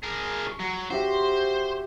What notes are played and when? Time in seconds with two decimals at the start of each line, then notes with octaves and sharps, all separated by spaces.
0.03 G#4 A#4
0.47 C#6
0.59 F#3
0.90 F#4 G4 C5 E5